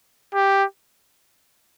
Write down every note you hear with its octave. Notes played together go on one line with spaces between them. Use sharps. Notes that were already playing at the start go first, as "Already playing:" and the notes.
G4